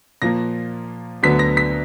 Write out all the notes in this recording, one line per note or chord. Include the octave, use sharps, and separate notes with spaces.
A#2 F3 A#3 A#6
D2 D3 F#3 B3 B6
A#6
B6